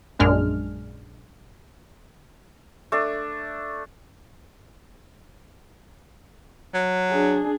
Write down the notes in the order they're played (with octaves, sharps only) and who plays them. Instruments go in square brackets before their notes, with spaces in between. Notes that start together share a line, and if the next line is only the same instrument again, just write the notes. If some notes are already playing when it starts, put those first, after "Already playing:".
[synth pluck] A#1 F#2 G#3 D4 F6
[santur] A3 D4
[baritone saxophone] F#3
[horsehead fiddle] D4 G#4